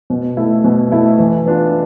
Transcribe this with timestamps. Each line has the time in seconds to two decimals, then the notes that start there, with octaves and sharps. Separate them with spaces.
0.10 B2
0.37 A3 E4
0.64 B2
0.91 A3 E4
1.19 E3
1.46 B3 D4 F4